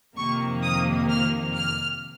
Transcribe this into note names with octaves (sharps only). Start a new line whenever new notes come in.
F2 C3 D#3 A#3 C#6
D#6
F6
F6